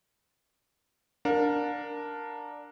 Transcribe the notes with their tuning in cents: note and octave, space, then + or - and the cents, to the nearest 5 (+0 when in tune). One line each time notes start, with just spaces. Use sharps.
D4 +0 A#4 +0 F5 +45